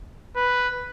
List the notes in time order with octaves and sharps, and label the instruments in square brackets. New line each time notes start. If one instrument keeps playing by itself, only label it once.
[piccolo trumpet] B4